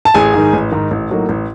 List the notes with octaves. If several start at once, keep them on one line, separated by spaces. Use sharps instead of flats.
A5
A1 G#4 G#5
G#2 D#3
A1
G#2 D#3
A1
A2 F#3 A#3 D#4
A1